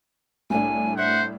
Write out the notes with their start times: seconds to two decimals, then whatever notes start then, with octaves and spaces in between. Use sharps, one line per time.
0.50 C2 A2 D4 G#5
0.97 C5 E5 F#5